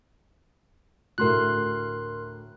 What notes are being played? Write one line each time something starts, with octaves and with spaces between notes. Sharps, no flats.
D2 A2 A#4 C6 F#6